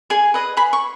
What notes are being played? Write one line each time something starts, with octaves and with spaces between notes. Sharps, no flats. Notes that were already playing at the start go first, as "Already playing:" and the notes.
G#4 G#5
B4 D#5
G#4 B5
C#6